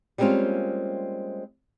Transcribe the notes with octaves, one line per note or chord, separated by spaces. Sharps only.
G3 G#3 A#3 C4 C#4 F4